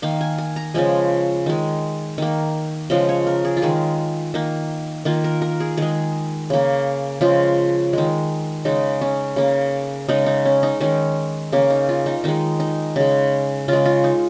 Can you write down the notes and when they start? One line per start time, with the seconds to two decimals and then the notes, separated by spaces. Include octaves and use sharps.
0.02 D#3 A#3 F5
0.21 G#5
0.38 G#5
0.56 A#5
0.74 C#3 F3 G#3 G#5
1.46 D#3 G#3
2.18 D#3 A#3
2.90 C#3 F3 G#3 D#5
3.09 C#5
3.27 A#4
3.45 G#4
3.57 F4
3.62 D#3 G#3 G#4
4.34 D#3 A#3
5.05 D#3 A#3 F4
5.24 A#4
5.42 A#4
5.60 G#4
5.77 D#3 G#3 G#4
6.50 C#3 A#3
7.21 C#3 F3 G#3 F4
7.93 D#3 G#3
8.65 C#3 G#3 D#4
9.01 C#4
9.36 C#3 A#3
10.08 C#3 G#3 D#4
10.26 D#4
10.45 C#4
10.63 D#4
10.80 D#3 G#3 C#4
11.52 C#3 A#3 C#4
11.70 D#4
11.89 F4
12.06 D#4
12.24 D#3 G#3 D#4
12.60 D#4
12.96 C#3 G#3
13.68 C#3 G#3 F4
13.86 F4
14.04 D#4